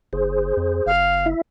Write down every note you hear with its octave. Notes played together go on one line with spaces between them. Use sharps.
F#1 G#4 C5
F2
F#1 F5
E4 E5